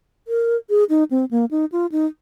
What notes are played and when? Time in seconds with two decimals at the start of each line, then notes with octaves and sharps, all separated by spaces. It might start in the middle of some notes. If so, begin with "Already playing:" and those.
0.28 A#4
0.70 G#4
0.89 D#4
1.11 C4
1.31 A#3
1.51 D#4
1.72 F4
1.92 D#4